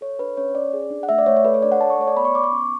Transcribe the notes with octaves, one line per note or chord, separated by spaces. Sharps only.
A4 C#5
D4 B4
C#4 C#5
C#4 D5
G#4
D4
F#5
A3 E5
D5
A3 C#5
C#5
A4 B4
C#5
D4 D5
F#5
A4 A5
C#6
A3 C#5
D5
B3 B5
C#6
B3 D6
C#6
C#4